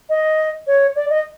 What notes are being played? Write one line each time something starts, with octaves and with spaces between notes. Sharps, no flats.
D#5
C#5
D5
D#5